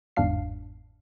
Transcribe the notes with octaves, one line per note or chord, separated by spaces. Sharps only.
G1 E2 G#2 D4 F5 C7